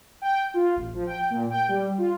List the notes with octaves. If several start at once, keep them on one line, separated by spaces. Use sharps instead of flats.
G5
F4
A1
F3
G5
A#2
G5
G3
F4